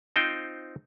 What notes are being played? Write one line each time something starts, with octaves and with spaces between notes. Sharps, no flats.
C4 D#4 F4 C5 G5